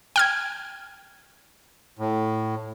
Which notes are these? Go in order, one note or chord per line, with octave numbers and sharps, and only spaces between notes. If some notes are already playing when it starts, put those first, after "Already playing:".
G5 F6 G#6
A2